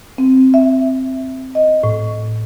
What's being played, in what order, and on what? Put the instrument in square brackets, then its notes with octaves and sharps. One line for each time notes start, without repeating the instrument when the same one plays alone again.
[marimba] C4
E5
D#5
A2